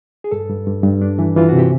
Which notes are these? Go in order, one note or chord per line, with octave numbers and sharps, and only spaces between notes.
G#4
G2 A4
G2
G2
G2
D4
E3
E3 F4
C3 F#4
G4